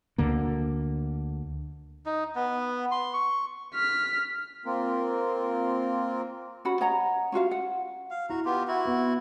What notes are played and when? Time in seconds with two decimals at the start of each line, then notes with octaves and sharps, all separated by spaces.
0.18 D2 D3 A#3
2.06 D#4
2.35 B3
2.91 C6
3.14 C#6
3.75 F6 B6
4.66 A#3 C4 F4 A#4
6.65 C#4 F#4 F#5 B5
6.81 C#5 D#5 F#5 A#5
7.32 C#4 F4 F#4 F5
7.51 F#5
8.10 F5
8.30 E4 F#4 A#5
8.45 B3 F4 G4
8.68 E4 F#4
8.85 B3